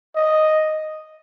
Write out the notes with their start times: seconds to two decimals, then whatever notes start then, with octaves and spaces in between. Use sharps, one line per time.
0.16 D#5